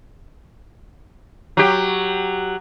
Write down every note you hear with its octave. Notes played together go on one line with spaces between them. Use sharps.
F#3 G4